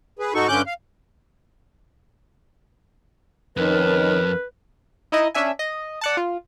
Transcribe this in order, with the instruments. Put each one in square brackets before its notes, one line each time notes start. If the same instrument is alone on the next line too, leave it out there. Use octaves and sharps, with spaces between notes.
[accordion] G#4 B4
G#2 D#4 F#4 A4 C#6
G2 D3 C#4 D6 F#6 G6
F5
[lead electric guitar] F2 [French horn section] D#3 C#4 D#4 [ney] A#4 [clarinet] B4
[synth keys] D#4 E4 D#5
C#4 D4 E5 G#5
D#5
D5 F#5 A5
F4